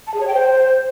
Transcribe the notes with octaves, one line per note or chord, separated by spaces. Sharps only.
A5
G#4
C#5
G5
C5